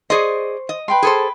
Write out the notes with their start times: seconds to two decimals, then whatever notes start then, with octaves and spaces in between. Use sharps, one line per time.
0.10 G#4 C5 D5 D#5 C#6
0.69 D#5
0.88 B4 G5 C6
1.02 G#4 A4 C5